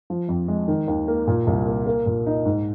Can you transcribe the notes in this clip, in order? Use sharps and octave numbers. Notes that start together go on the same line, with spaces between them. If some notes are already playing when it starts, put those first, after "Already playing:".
F3
F2
G#3
D#3
D#2
A#3
A#2
C2
A#3
A#3
A#2
D#4
G#2